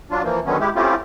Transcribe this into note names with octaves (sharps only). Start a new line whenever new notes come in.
F#3 D4 F4
E3 F3 A#3
D3 D#3 F#3 B3 C#4
G#3 E4 G4
A3 C4 C#4 E4 F4 G4